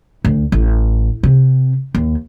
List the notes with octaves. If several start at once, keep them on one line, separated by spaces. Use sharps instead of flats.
D2
A1
C3
D#2